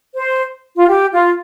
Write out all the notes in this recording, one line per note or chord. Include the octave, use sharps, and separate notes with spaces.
C5
F4
G4
F4